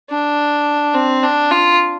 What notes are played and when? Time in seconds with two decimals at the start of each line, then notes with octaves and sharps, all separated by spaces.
0.10 D4
0.94 C4
1.23 D4
1.51 F4